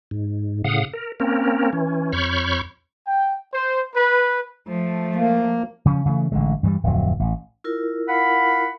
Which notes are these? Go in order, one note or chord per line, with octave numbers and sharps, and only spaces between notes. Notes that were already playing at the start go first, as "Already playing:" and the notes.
G#2
A2 C#3 F5 F#5 D#6
A#4
A#3 C4 C#4 A#4
E3 C#4
F2 C#5 B5 C#6 F6 G6
G5
C5
B4
F3 A3
A#3
C#3 F3 C#4
C#3 E3 F#3 A3
A1 D3 G#3
G2 E3 F#3 G3
D1 F2 F#3
A1
E4 F4 A#4
F5 F#5 B5